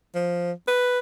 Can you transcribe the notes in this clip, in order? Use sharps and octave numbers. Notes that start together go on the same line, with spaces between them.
F3
B4